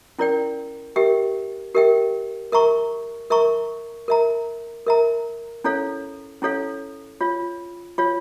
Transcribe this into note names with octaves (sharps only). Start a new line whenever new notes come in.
C#4 E4 A#4 D5 G5
G4 A#4 E5 G5
G4 A#4 E5 G5
A#4 E5 A#5 C#6
A#4 E5 A#5 C#6
A#4 E5 A#5
A#4 E5 A#5
C#4 E4 A4 C#5 F5
C#4 E4 A4 C#5 F5
F4 C#5 F5
F4 C#5 F5